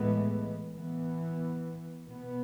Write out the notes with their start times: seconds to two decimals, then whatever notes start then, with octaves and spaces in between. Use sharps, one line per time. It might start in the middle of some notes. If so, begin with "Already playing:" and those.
Already playing: A2 E3 G#3 B3
0.73 E3 B3
2.05 B2 B3